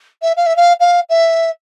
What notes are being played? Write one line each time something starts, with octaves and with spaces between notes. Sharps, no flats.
E5
F5
E5
F5
F5
E5